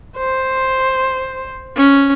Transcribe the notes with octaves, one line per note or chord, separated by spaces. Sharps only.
C5
C#4